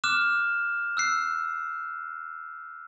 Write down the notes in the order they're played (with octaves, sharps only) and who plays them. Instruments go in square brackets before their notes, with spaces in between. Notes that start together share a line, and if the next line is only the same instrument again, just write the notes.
[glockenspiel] D6 F6 F#6 E7
E6 F#6 C7